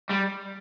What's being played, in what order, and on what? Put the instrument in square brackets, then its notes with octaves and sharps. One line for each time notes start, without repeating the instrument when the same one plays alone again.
[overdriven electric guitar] G3